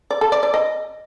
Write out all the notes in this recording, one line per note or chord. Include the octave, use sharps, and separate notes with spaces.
D5
A4
D5
D5
D#5